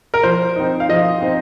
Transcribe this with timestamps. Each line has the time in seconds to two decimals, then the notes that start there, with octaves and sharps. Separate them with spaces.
0.14 A#4
0.23 F3 C5
0.56 C4 D#4
0.80 F5
0.89 F3 D#5
1.22 C4 D#4